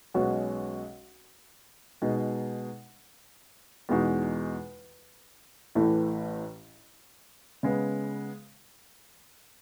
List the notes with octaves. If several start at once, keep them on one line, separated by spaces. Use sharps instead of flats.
B1 B2 G#3 C#4 F#4
B2 G#3 D#4
E2 B2 G#3 D#4 F#4
A1 A2 E3 A3
C#3 G#3 B3